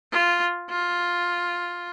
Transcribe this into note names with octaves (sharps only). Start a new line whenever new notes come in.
F4
F4